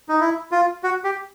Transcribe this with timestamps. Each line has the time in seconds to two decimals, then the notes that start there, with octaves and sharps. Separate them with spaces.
0.09 D#4
0.20 E4
0.52 F4
0.84 F#4
1.04 G4